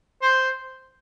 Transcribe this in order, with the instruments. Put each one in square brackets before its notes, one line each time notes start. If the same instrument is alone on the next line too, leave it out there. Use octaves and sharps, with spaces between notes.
[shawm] C5